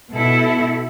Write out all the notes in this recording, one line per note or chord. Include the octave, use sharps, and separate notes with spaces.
B2 E4 A4